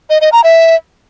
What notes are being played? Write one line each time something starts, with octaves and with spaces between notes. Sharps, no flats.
D#5
D#5
A#5
E5